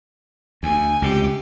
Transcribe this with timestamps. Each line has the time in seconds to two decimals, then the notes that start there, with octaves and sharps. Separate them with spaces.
0.63 D2 G#5
1.02 C#2 C3 G4